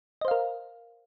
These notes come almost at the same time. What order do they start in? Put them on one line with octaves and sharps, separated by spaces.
D#5 C5 F5 A#4